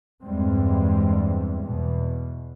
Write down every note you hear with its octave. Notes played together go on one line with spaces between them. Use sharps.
E2 G2 G3 G#3 C4
E2 B2